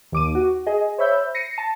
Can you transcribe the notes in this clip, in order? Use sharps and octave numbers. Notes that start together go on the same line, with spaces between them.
D#2 D6 D#7
F#4
G#4 D#5
C5 C#5 E5 B5 E6 G6
A#6 C7 C#7 D#7
A5